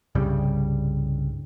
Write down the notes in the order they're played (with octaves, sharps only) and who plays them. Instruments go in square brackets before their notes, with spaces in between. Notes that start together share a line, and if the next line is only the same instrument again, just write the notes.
[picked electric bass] C2 G2 C#3 G3